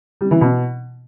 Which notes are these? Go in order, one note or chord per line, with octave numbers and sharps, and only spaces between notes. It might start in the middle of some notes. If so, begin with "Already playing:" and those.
G3
E3
B2